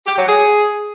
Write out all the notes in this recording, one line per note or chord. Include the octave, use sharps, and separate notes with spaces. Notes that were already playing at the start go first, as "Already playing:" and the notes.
G4
F#3
G#4